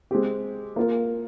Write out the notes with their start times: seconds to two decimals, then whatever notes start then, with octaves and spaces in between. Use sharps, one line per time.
0.11 G#3 C4 G4
0.76 A#3 F4 A#4